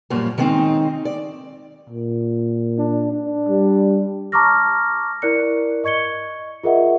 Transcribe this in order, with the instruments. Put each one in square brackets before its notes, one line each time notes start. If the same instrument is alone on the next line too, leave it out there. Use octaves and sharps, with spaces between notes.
[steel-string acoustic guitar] F#2 A#2 F3 G3
D#3 G3 G#3 C4 C#4 D#4
D5
[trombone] A#2
[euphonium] D4
D4
[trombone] G3
[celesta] A5 A#5 C#6 D6 F6 A#6
E4 A#4 D5 F#6 C#7
D#5 C#6 G#6 C#7 G7
F4 G#4 A#4 D#5 E5 F#5